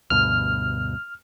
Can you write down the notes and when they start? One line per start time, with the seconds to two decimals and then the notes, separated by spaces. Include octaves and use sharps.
0.10 D2 G2 B2 F6